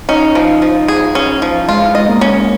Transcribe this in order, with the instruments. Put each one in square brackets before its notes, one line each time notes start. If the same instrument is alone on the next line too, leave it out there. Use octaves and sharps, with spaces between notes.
[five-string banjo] C#4 [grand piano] D#4
[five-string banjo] F3
F3
G#4
C#4
F3
[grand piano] G#3 [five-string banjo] F4
[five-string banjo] D#5
[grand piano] A#3
[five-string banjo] C#4